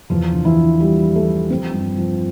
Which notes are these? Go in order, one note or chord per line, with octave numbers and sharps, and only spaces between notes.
E2 F3 F4
D3
E3 E4
F3
F3 G3 G4
F3
A3 A4
F3
F3 C4 C5
G2
F3